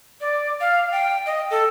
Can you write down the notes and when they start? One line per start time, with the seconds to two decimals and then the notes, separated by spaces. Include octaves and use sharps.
0.21 D5
0.61 F5
0.92 G5
1.26 D#5
1.51 A4